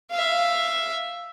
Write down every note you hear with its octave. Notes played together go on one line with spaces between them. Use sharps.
E5 F5